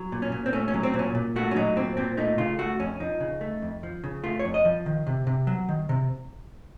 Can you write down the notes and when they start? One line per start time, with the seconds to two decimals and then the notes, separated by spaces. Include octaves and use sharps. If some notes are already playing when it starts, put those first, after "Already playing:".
Already playing: F#3
0.12 A#2
0.22 C#4
0.32 A#2
0.46 C4
0.53 A3 C#4
0.68 C#4
0.74 F#3
0.83 C4
0.94 A#2
0.99 C#4
1.15 A#2
1.36 A3 F#4
1.51 C#4
1.56 F#3 D#4
1.76 A#2 C4
1.97 A#2 C4
2.17 A3 D#4
2.38 C#3 F4
2.59 A3 F#4
2.80 F2 C#4
3.00 F3 D#4
3.20 C#3
3.41 A3
3.62 F2
3.83 F3
4.04 C#3
4.23 A3 F4
4.39 C#5
4.45 F2
4.54 D#5
4.65 F3
4.86 D#3
5.07 C3
5.27 C3
5.47 F#3
5.69 D#3
5.89 C3